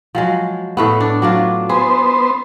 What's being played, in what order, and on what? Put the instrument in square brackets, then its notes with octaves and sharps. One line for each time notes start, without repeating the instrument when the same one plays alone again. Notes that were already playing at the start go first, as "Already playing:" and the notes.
[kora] F3 F#3 G#3
A2 A3 B3
D4
F#3 D4 F4
[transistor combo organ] B3 C5 [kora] G#4